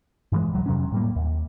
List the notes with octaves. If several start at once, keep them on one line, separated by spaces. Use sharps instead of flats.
G2 E3 G#3
D1 C2 F#3
F2 C3 F#3 C#4
A2 G3 A#3
D#2